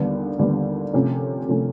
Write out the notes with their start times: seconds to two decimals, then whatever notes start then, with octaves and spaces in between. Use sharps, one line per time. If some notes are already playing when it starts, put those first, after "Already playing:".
Already playing: D#2 D3 G3 B3
0.39 D#2 D3 G3 B3
0.94 C3 F3 A3 C#4
1.48 C3 F3 A3 C#4